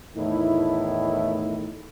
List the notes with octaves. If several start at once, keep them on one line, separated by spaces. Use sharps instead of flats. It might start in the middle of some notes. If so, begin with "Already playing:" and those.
E2 A2 D#3 A3 D#4 E4